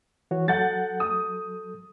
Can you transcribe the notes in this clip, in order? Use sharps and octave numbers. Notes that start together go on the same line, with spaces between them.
E3 F#4 C#5
F#3 A4 F#5 G6 A6
D#6